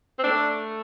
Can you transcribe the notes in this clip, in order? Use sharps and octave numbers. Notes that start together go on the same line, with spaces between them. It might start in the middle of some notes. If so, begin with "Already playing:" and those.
C4
A3 D4